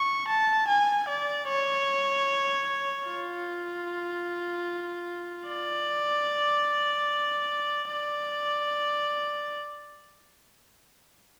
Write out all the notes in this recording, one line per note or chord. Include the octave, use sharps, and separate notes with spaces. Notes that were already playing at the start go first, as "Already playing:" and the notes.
Already playing: C#6
A5
G#5
D5
C#5
F4
D5
D5